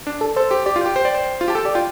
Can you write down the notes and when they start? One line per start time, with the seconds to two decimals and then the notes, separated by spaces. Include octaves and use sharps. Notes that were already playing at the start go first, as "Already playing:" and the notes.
0.07 D4
0.21 A4
0.36 A4 C5
0.50 G4 C5
0.66 G4 D5
0.76 F4
0.81 G4 G5
0.96 C5
1.05 D5
1.15 C5
1.41 F4
1.48 G4 A5
1.55 A4 G5
1.65 G4 D5
1.75 F4 G5